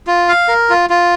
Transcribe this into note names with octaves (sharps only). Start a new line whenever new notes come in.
F4
F5
A#4
F4
F4